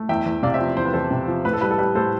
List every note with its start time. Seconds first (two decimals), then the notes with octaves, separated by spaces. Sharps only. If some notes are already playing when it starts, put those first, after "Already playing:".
Already playing: A3
0.09 E2 E5 G5
0.26 E2
0.43 C3 D5 F5
0.54 C5 E5
0.60 F3
0.77 E2 C5
0.85 B4
0.93 E2 A4 C5
1.11 C3
1.27 F3
1.45 A2 B4
1.53 A4
1.61 G3 B4
1.71 A4
1.78 G3 B4
1.95 A2 A4 C5